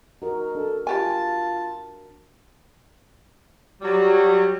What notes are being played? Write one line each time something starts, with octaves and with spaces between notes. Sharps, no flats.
D#4 F#4 A#4
D4 A4
G3 F4 G4 G#5 A5
F#3 G3